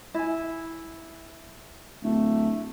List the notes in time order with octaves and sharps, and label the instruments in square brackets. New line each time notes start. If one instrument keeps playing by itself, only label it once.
[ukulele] E4 G#5
[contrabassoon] D1 [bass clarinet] A3